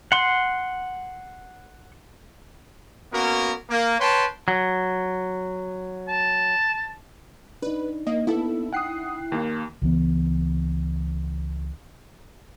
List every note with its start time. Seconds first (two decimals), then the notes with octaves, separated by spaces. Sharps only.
0.12 F#5 C6
3.12 A#3 B3 C#4 F#4 A#4
3.69 A#3
4.00 B4 C#5 G5 A5 C6
4.48 F#3
6.08 A5
7.62 D4 D#4 B4
8.07 A#3 D#5
8.27 A#3 B3 E4 A4
8.73 F#5 G5 D#6 F#6 C7
9.32 D#2 A#3
9.82 C#2 E3 B3